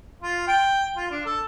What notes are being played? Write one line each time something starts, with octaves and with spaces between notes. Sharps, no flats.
F4
G5
F4
D4
A4